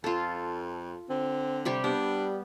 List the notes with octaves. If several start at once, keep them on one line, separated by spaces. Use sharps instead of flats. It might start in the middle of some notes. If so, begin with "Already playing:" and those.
F2 F4 A4
D3 C4
C3 G3 G4
G3 B3 D4